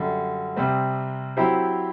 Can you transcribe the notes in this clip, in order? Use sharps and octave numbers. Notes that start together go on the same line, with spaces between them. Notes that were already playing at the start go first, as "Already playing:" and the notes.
Already playing: F#2 D3 G3
C3 G3 C4
F#3 C4 E4 G4 C5